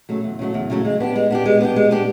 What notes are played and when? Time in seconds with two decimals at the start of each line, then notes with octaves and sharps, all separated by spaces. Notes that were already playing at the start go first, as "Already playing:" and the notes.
0.09 C#3 F#3 A3
0.24 E2
0.39 C#3 F#3 A3
0.54 E2
0.70 C#3 F#3 A3
0.85 G#3
1.00 B3 D4 G4
1.16 G#3
1.31 B3 D4 G4
1.46 G#3
1.61 B3 D4 G4
1.76 G#3
1.91 B3 D4 G4